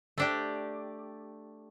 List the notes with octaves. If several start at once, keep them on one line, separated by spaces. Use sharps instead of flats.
A3 D4 G4